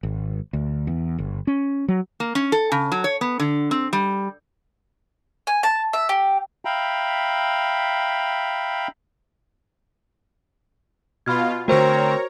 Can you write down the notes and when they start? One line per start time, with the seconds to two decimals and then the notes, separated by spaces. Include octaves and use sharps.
0.03 G#1
0.53 D2
0.87 E2
1.18 G1
1.47 C#4
1.88 F#3
2.20 A#3
2.35 C#4
2.52 A4
2.72 C#3
2.92 F#3
3.04 C#5
3.21 B3
3.39 D3
3.71 C4
3.93 G3
5.47 G#5
5.63 A5
5.93 E5
6.09 G4
6.65 E5 F5 G5 A#5 B5
11.26 B2 F4 B5 F6 G#6
11.68 D3 A3 C4 F#4 A#4 C5 C#5 A#5